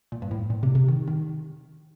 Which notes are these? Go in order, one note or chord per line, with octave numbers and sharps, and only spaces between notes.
A#2
G2
A2
A#2
C3
C3
D#3
D#3